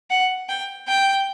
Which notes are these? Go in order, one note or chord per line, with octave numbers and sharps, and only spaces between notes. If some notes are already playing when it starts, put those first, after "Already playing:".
F#5
G5
G5